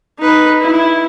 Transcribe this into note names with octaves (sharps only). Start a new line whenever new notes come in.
D#4 B4
E4